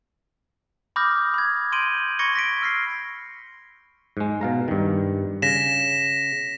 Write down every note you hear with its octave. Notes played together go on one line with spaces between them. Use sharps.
B5 D6 D#6 F6 G6 A#6
B5 G#6
C6 G6 D7 D#7 F#7
B5 C#6 G#6 A#6 C#7 G7
A#6 B6 D7
E6 F6 B6 C7
G#2 G#3
B2 F5 A#5
G2 D#3
C#3 A#6 B6 E7